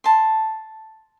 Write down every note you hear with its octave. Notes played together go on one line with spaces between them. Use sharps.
A5 C6